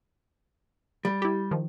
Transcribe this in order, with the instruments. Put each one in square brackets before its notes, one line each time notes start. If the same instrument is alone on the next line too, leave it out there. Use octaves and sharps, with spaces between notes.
[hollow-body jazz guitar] G3
[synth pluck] E4 G4
D#3 F3